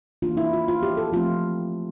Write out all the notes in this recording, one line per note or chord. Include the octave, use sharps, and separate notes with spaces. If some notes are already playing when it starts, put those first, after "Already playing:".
E3 A#3 D4 F4
E4
F4
F4
G4
A4
F3 A3 C4 F4